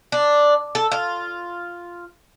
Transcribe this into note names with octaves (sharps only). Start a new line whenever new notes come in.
D4
A4
F4